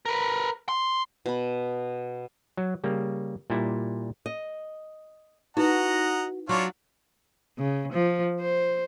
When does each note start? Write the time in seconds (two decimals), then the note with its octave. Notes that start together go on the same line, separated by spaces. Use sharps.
0.06 A#4 B4
0.69 C6
1.26 B2 B5
2.57 F#3
2.84 C#3 G3 A#3
3.50 A#2 G3 E4
4.26 D#5
5.57 D#4 E4 F#4 B4 D#5 F#5 A#5
6.49 F#3 D4 F4 C#5
7.58 C#3
7.93 F3
8.41 C5